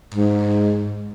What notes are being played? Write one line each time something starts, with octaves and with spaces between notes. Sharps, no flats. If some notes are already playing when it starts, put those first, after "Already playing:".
G#2